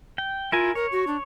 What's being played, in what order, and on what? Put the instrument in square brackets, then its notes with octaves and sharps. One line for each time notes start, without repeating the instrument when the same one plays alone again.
[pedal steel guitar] G5
[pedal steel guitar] E4 A#4 G#5 [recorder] F4
[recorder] A#4 [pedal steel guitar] C#5
[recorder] F#4
D4